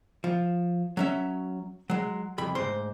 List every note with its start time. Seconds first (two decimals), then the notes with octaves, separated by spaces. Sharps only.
0.24 F3
0.97 F#3 C#4 E5
1.90 F#3 G#3
2.38 C2 F2 B5
2.55 D2 G#2 C5 C6